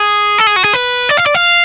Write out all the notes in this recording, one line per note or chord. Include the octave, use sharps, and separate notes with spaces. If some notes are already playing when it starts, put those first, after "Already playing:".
Already playing: G#4
A4
G#4
F#4
G#4
B4
D5
F5
D5
F5